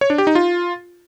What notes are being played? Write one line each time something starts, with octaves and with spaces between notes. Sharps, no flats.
C#5
D4
G4
D#4
F4